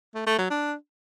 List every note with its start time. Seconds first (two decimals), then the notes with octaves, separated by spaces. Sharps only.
0.15 A3
0.27 A3
0.38 F#3
0.50 D4